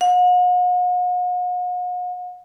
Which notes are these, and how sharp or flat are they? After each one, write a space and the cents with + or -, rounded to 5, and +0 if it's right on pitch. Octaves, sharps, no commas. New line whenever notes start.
F#5 -45